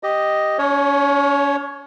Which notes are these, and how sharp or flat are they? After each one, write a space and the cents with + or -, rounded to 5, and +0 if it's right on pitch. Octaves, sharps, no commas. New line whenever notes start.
G4 +0 D#5 +0
C#4 +40 C#5 +0